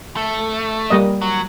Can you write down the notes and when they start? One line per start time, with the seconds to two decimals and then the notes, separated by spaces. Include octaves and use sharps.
0.17 A3
0.90 G3 A#3 D#5
1.22 F#3